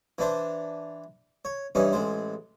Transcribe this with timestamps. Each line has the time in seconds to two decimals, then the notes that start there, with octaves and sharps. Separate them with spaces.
0.18 E3 D4 C5
1.45 C#5
1.75 G2 E3 C#4 D#4
1.93 A1 G#3 C5